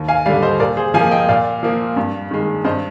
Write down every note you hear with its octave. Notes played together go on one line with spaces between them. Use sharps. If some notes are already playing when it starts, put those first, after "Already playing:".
Already playing: D#2
F5 G#5
D3 G3 D5 F5
C5 D#5
A#2 A#4 D5
G#4 C5
F3 F5 G#5
A#3
D#5 G5
A#2 D5 F5
F3 A#3
G2
D#3 G#3
G2 C5 D#5